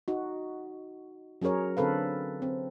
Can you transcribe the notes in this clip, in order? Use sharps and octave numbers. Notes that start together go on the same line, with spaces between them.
D#4 F#4
F#3 C#4 G#4 A#4 C#5
D3 C4 A4 B4 F5
C4